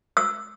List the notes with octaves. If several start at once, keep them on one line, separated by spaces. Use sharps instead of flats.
E6